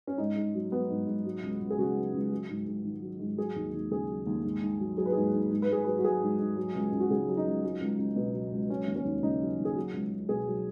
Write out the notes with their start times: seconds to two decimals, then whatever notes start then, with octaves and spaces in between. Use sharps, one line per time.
0.07 C#4
0.18 G#2 D#4
0.36 G#2
0.55 F#3
0.71 F#3 B3
0.90 G#2
1.07 G#2
1.25 F#3
1.43 C#2
1.61 C#2
1.70 G#4
1.78 C#3 F#4
1.96 F#3
2.13 C#2
2.31 F#3
2.49 G#2
2.67 G#2
2.84 D#3
3.02 F#3
3.19 G#2
3.37 F#3 G#4
3.56 D#2
3.74 D#2
3.91 C#3 G#4
4.09 F#3
4.26 D#2
4.44 G#2
4.61 G#2
4.80 F#3
4.97 F#3 G#4
5.06 B4
5.12 G#2 G#4
5.33 G#2
5.51 G#2
5.62 B4
5.68 G#2 G#4
5.84 F#3 B4
5.98 F#4
6.04 F#3 G#4
6.22 G#2
6.39 G#2
6.56 F#3
6.75 C#2
6.92 C#2
7.00 F#4
7.10 C#3 G#4
7.28 F#3
7.37 D#4
7.45 C#2
7.63 F#3
7.81 C#2
7.98 C#2
8.16 B2
8.34 F#3
8.52 C#2
8.69 F#3 C#4
8.87 D#2
8.96 C#4
9.05 D#2
9.23 C#3 D#4
9.41 F#3
9.59 D#2
9.65 G#4
9.76 F#3 F#4
9.93 C#2
10.12 C#2
10.29 B2 G#4
10.48 F#3